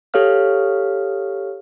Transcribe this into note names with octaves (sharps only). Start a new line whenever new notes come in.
G4 A4 C#5 F5 F6